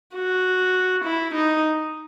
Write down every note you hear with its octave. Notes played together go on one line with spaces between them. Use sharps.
F#4
E4
D#4